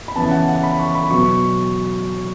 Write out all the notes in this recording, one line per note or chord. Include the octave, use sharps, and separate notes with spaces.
B5
C#3 E3 B3 A5
F#5
F#5
B5
C#6
B5
B2 F#3 B3 C#6